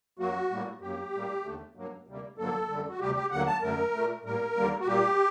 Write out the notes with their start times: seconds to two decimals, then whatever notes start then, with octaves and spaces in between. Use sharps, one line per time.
0.19 F#2 F#3 A#3 F#4
0.51 A2 G3 A#3
0.81 F#2 F#3 A#3 G4
1.13 A2 G3 A#3
1.45 D#2 D3 A3
1.75 G2 F#3 A#3
2.07 D2 C3 G3 A#3
2.38 G2 D3 F#3 A#3 A4
2.69 F#2 D3 G3
2.88 F#4
3.00 D2 C3 G3 G4
3.15 G4
3.31 D2 D3 F#3 A#3 F#5
3.46 A5
3.62 F#2 D3 F#3 A3 A#4
3.93 A#2 A3
4.24 A2 G3 A#3 A#4
4.56 D#2 D3 G3 A#3
4.80 F#4
4.87 A#2 G3 A#3 G4